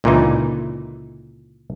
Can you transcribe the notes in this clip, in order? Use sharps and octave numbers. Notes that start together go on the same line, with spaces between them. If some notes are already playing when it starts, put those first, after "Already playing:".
C#2 A#2 D3 E3 D#4